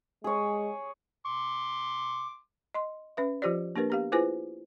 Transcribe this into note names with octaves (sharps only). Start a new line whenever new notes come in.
G#3 G#4 C#5
C6 D6
D#5 C6
C#4 B4 E5
F3 F4 G4 C5 D5
A#3 D4 G4 A#4 B4
B3 G4 F5
E4 F4 G#4 B4 C5 G#5